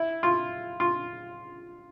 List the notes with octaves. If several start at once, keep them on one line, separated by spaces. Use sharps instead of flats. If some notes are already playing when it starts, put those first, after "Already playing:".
Already playing: E4
F4
F4